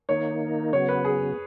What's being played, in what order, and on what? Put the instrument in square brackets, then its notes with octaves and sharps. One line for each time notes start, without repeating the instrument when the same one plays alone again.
[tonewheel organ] D#3 A#3 D#4 [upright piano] C#5
[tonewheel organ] C#3 F#3 B3 [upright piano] C#5
[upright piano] B4
G#4